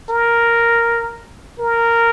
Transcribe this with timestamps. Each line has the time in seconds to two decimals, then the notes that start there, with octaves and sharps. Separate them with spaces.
0.09 A#4
1.59 A#4